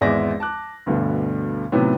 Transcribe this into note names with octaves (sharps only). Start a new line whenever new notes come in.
G#1 E2 G#3 D5 E5 A#6
A5 D6 F#6
D2 G2 B2 D3
A2 C3 D#3 F#3 B3